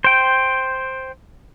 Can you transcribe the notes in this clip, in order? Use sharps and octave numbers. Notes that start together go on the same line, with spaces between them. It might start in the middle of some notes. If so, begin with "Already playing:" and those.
C5 G5